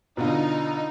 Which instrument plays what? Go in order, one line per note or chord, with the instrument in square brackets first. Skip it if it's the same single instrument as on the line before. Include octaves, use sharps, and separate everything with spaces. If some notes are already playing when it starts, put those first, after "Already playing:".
[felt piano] B2 D3 F4 [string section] D#4